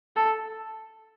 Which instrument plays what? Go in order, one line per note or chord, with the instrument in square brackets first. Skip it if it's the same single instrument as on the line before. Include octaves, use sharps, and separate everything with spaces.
[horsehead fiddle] A4